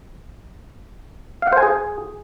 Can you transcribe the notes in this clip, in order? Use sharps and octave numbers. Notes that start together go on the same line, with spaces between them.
F5
F#5
C5
G#5
G#4